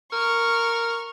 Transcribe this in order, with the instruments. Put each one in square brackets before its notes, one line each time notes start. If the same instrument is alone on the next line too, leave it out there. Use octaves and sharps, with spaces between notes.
[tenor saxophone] A#4 [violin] C#6 F6